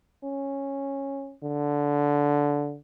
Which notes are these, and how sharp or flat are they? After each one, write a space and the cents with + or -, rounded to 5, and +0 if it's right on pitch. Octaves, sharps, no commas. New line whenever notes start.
C#4 -10
D3 -15